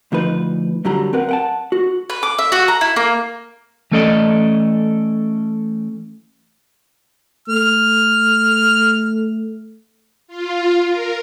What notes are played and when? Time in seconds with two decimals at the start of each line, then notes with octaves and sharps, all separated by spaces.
0.12 D2 F3 D#4 B4
0.85 F#2 D3 F#3 G3 A#5
1.13 C4 A#4 B4 F#5
1.29 F#5 G5 A5
1.72 F#4
2.10 B4
2.23 D6
2.38 E5
2.52 F#4
2.68 A#5
2.81 E4
2.96 A#3
3.91 E3 A3 C#4 A4 D5 D#5
7.48 A3 F6
10.28 F4
10.89 A#4